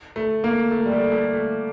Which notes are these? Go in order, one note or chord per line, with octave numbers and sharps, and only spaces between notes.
A3
A#3
A3
G3
A3
A3
A3